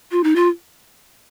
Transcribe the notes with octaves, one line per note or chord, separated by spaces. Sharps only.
F4
D#4
F4